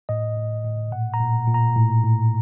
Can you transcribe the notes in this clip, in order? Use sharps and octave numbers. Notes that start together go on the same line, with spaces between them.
A2 D#5
A2
A2
A#2 F#5
A#5
A#2
A#2
A#5
A2
A2